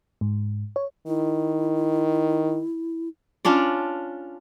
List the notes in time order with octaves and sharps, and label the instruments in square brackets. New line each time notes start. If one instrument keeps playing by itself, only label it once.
[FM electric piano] G#2
C#5
[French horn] D#3 [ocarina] E4
[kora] C#4 D4 F4 D5